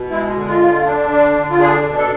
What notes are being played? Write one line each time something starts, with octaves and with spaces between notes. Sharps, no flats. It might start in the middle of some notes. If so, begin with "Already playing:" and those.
Already playing: B2
G#3 E4
D3
F4
D3
D4
D3
D3
F4
D4 G#4
B2
A4